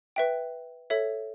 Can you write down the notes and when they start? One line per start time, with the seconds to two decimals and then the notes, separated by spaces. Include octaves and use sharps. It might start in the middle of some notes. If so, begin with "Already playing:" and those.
0.16 B4 E5 G5
0.90 A4 C#5 E5